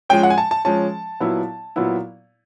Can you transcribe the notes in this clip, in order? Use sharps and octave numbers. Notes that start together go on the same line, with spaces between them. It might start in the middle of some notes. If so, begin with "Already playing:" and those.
F3 G#3 C#4 G5
F#5
G#5
A5
A5
F3 G#3 C#4 A5
A#2 F#3 B3 E4
A#2 F#3 B3 E4